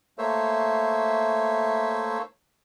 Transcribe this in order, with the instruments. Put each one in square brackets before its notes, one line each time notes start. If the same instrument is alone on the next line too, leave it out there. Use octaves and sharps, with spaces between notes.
[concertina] A3 A#3 C5 C#5 E5